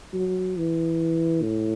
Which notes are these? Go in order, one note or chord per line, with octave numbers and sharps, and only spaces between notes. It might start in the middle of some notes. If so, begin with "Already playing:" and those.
F#3
E3
A2